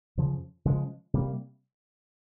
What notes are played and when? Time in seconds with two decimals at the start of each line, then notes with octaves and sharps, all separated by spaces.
0.17 F2 C#3 F3
0.65 C#3 F3 G#3
1.14 C3 G3 A#3